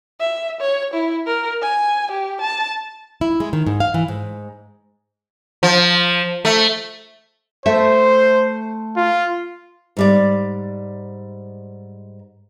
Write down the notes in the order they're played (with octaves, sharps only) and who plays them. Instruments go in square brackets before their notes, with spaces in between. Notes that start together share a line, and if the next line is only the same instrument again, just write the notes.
[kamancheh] E5
C#5
E4
A#4
G#5
G4
A5
[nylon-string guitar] E4
G#3
D#3
G#2
F5
E3
G#2
[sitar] F3
A3
[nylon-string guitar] A3 A4 E5 [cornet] C5
[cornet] F4
[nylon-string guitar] G#2 G3 D5